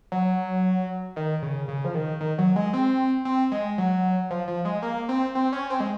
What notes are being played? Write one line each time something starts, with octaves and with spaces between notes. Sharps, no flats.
F#3
D#3
C#3
C#3
F3
D#3
D#3
F#3
G#3
C4
C4
G#3
F#3
F3
F3
G#3
A#3
C4
C4
C#4
C4
G#3